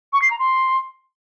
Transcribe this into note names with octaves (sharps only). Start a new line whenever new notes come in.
C#6
C7
A#5
C6